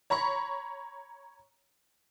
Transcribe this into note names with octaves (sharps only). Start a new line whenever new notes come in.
C#5 A#5 B5 C#6